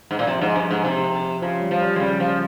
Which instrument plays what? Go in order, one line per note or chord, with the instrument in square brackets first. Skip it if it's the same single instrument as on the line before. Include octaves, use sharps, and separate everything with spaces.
[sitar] G#2
A#2
[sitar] C3 [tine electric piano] F3
[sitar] G#2
G2
G#2
C3
[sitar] C#3 [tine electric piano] F3
[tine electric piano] G3
[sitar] F3
[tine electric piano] G3
[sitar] G#3
[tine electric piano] C#3 [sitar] G3
[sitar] F3